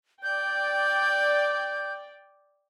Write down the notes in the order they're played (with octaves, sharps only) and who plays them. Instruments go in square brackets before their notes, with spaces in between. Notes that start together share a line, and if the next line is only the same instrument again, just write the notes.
[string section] D5 G5 [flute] G6